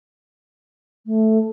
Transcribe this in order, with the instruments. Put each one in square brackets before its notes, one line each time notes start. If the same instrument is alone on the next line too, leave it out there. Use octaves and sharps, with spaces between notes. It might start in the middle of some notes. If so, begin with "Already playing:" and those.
[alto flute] A3